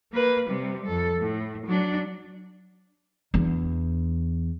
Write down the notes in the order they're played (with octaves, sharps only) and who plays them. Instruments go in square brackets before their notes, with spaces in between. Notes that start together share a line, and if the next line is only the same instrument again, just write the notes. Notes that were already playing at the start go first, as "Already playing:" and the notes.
[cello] A#3 B4
C3 G3
F2 A4
A2
F#3 D4
[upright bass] E2 D4